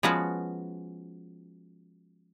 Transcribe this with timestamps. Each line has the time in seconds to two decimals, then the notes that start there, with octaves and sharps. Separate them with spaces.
0.03 F3 G#3 B3 C#4 F#4